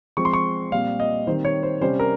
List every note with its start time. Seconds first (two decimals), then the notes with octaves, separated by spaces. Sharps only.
0.17 F3 G#3 C4 C#6
0.25 C6
0.33 C#6
0.72 A#2 G3 C4 F5
1.00 D#5
1.27 D#3 G3 C4 C5
1.45 C#5
1.63 C5
1.81 C3 G3 C#4 C5
2.00 A#4